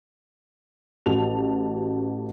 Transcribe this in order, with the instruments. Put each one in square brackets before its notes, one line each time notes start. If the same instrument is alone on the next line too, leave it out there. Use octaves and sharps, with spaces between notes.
[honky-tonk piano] A1 F#4 G4 A5 F7